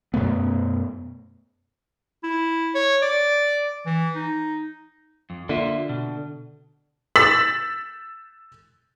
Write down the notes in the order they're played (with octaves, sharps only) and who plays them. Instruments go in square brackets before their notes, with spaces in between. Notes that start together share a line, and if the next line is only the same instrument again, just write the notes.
[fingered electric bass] F#2 B2 A3 B3
[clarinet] E4
C#5
D5
E3
D#4
[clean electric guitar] F2
[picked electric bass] D3 [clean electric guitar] A#3 F4 E5
[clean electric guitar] B2
[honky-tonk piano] E6 A6 B6 F#7